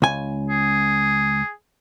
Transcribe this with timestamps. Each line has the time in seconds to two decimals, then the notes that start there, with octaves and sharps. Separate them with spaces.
0.02 C#2 G#5
0.49 G#4